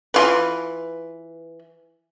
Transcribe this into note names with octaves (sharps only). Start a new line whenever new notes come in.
E3 F4 B4